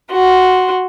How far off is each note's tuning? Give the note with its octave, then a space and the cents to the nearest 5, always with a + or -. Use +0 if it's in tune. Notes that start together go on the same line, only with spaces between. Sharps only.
F#4 +0 C6 +0